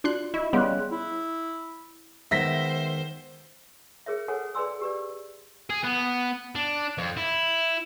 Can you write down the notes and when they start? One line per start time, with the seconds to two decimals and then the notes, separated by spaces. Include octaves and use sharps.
0.04 D4 F4 F#4 D5 C6 F#6
0.34 E4 D#5 C#6
0.53 C#3 G3 B3 D#5 C6 F#6
0.91 E4
2.31 D#3 G#3 B3 C5 E5 A#6 B6
4.06 G#4 A#4 C#5 E5
4.28 A4 A#4 C5 C#5 F#5 G#5
4.55 G#4 B4 D5 G#5 C6 E6
4.81 G4 B4 D5
5.70 G#4
5.84 B3
6.55 D4
6.98 F2
7.17 E4